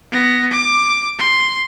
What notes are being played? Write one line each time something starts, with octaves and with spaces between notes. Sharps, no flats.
B3 A#6
D6
C6